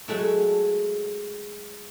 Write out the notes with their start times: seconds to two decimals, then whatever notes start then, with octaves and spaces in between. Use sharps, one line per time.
0.08 F#3 G#3 A3 E4